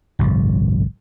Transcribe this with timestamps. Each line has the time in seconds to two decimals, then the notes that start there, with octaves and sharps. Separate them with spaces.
0.19 G1 C2 A2 F3